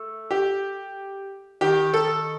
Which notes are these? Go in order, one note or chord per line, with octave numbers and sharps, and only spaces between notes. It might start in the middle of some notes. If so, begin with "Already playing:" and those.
Already playing: A3
G4
D#3 G4
A4